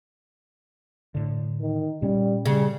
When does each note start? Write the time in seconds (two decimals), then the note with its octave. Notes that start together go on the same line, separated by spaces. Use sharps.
1.15 A2 D3
1.61 D#3
2.02 A#2 G3 C#4
2.45 C#3 G3